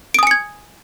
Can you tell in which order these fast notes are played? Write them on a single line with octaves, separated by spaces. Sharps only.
D7 D#6 G#5 C#7 G#6